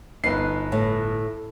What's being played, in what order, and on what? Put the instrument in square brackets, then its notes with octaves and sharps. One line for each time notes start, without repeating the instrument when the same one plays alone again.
[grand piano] G1 B4 C7 [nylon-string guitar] D#4
[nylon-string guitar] A2